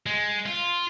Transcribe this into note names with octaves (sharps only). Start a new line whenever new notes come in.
G#3
F4